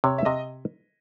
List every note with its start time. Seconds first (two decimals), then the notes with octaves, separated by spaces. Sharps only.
0.04 C3 C#5
0.18 E5
0.25 C3 D#5